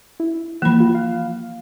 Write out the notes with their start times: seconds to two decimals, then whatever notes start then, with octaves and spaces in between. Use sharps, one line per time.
0.20 E4
0.62 E3 F3 A#3 B5
0.80 F4
0.95 F5